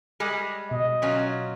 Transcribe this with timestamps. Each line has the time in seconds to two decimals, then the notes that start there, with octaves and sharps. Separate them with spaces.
0.20 G3 G#3 G#4
0.71 B2 D#5
1.02 F#3 C#4 F4